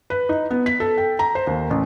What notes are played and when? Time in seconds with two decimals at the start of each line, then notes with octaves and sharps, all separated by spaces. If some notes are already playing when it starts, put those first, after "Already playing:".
0.10 B4
0.29 D#4
0.50 B3
0.66 B6
0.80 A4
0.98 G5
1.19 A#5
1.35 C5
1.47 D#2
1.70 A1